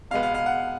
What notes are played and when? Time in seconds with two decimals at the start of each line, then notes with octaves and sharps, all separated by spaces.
0.11 B2 G#3 B3 F5
0.23 F5
0.34 F5
0.46 F#5